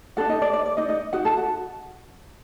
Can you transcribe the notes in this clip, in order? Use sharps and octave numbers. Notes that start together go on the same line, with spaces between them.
D4 F#4 A4 F#5
D#4 D#5
D5
D5
D5
D#4 D#5
D#4 D#5
D#4 F#4 F#5
A4 A5
F#4 F#5